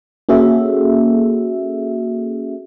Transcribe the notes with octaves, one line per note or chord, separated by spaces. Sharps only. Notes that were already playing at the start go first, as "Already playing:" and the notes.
A#3 C#4 F#4 G#4 A4 E5